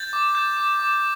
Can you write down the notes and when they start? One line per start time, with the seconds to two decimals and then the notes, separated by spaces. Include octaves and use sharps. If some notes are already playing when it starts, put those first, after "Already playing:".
Already playing: G6 A6
0.13 D6
0.35 G6
0.57 D6
0.80 D6